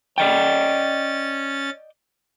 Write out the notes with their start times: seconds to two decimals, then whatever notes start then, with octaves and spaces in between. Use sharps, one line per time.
0.18 C#4 D5 D#5 G5 A6